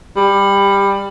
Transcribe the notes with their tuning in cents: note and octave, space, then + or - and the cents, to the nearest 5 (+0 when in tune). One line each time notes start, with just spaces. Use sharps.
G3 +20